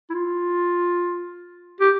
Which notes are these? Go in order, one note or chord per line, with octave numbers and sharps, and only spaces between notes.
E4
F4
G4